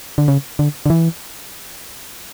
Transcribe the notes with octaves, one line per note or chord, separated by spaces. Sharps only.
D3
C#3
D3
D3
E3